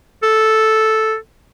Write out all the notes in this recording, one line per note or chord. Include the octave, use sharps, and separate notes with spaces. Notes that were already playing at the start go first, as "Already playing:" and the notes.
A4